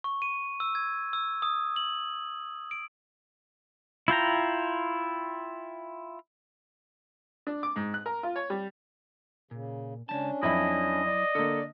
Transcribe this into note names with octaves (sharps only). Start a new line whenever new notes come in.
C#6
D#7
E6
G#6
E6
D#6
F#7
D7
E4 F4 G5 A#5
D4
D6
G#2
F#6
A#4
F4
C#5
G3
A#2 C#3
C#2 F#3 C#4 D4 A5
F2 F#3 E4 D#5 E5 B5
D5
D3 A#3 A4